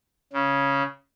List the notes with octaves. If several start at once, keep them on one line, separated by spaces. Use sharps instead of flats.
C#3